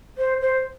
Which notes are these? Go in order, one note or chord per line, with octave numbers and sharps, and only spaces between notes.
C5
C5